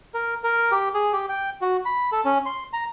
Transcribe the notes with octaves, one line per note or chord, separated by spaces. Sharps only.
A#4
A#4
G4
G#4
G4
G5
F#4
B5
A4
C#4
C6
A#5